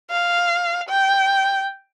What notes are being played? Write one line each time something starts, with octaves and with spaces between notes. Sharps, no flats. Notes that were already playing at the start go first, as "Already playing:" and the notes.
F5
G5